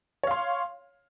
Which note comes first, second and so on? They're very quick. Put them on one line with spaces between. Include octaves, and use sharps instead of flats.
C#5 F5 C6